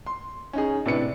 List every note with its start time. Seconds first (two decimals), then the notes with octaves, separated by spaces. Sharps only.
0.06 C6
0.53 C#4 D#4 G#4
0.85 A2 C3 D4 B4 C#7